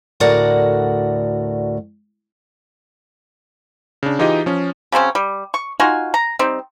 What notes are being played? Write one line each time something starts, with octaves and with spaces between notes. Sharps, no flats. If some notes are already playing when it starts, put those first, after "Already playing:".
D2 A2 F#4 A#4 D5 F#5
C#3 D4
E3 D#4 F4 G4 G#4 D#5
F3 C#4
C#3 F#3 C4 C#4
G3
C#6
D#4 F4 F#4 G#5
A#5
G3 C4 D#4